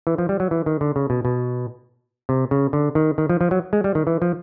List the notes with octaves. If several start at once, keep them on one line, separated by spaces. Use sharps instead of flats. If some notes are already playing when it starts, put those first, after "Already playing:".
E3
F3
G3
F#3
E3
D#3
D3
C#3
B2
B2
C3
C#3
D3
D#3
D#3
F3
F3
F#3
G#3
G3
D#3
E3
F3